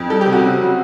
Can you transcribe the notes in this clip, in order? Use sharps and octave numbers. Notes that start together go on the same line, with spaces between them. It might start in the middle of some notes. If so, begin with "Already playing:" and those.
Already playing: F2
G3 A4
G4
C3
F#4
C#3
F#3